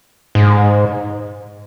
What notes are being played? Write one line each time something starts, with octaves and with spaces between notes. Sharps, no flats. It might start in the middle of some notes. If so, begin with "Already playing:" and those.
G#2